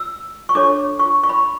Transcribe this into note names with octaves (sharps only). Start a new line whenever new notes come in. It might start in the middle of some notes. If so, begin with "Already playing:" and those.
Already playing: E6
C#6
D4 A4 C#5 D6
C#6
C#6
B5